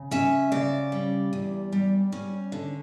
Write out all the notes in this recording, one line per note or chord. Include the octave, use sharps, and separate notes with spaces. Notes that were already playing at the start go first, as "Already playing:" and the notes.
Already playing: C#3
C#4 E5
C#3 D5
G3
E2
G3
C#4
D3